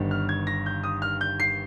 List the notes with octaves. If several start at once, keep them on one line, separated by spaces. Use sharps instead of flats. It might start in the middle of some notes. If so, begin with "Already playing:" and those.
Already playing: G1 G2 D#3
F6
G#6
A#6
G6
D#6
F6
G6
C7